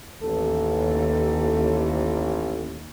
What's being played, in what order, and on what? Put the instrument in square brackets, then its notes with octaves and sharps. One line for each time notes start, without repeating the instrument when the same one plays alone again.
[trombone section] A1 [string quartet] D#2 [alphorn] A4